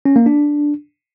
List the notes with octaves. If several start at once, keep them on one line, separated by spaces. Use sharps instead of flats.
C#4
A#3
D4